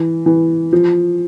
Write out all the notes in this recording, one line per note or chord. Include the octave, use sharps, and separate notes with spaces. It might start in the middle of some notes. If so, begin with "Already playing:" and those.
Already playing: E3
E3
F3